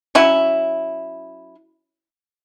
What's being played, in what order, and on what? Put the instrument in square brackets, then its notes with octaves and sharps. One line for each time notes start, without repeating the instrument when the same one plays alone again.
[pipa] F#3 C#4 E4